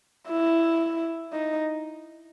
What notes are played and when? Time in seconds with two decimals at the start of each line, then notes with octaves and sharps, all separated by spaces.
0.29 E4
1.33 D#4